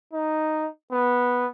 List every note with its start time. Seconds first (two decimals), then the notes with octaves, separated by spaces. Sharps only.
0.13 D#4
0.92 B3